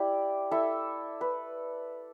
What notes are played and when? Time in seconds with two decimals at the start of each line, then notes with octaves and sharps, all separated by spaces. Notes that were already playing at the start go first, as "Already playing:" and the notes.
Already playing: E4 G4 D5
0.51 E4 A4 E5
1.21 B4